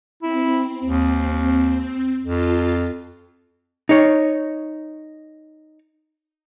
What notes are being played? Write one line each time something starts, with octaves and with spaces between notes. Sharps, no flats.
C4 E4
D#2
F2 F4 A5
D#4 C#5